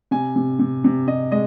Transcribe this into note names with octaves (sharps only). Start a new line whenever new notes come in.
C3 G#5
C3
C3
C3
C3 D#5
G#3 D#5